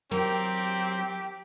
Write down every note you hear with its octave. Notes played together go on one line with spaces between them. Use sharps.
F#3 C4 G4 A#4